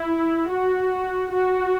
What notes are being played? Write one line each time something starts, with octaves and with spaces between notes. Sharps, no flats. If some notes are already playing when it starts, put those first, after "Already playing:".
Already playing: E4
F#4
F#4